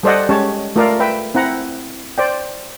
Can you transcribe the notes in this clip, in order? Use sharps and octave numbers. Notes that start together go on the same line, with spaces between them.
G3 A4 C5 D5 D#5 F#5
G#3 C#4 G4 C#5 A5
A3 F4 A4 A#4 D5 F5
B4 E5 G5
C4 E4 F#5 A#5
C5 D5 G5